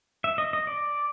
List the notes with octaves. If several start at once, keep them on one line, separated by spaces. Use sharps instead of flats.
E5
D#5
D#5
D5